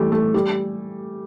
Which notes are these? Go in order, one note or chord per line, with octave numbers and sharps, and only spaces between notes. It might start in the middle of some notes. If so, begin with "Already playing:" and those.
Already playing: E3 G3 A3
A3
G3